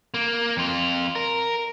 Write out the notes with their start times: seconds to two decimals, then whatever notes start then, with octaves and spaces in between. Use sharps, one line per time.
0.14 A#3
0.57 F2 F4
1.15 A#4